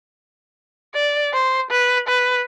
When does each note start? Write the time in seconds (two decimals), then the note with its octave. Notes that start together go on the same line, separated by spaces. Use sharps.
0.94 D5
1.33 C5
1.71 B4
2.08 B4